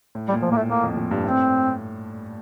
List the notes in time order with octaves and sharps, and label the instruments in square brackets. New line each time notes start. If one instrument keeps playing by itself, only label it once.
[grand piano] A2
[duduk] G3
[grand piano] A#2
[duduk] F3
[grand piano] A2 [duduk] A#3
[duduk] A3
[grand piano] A2 [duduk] A#3
[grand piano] F2
F2
G2
[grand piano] A2 [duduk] C4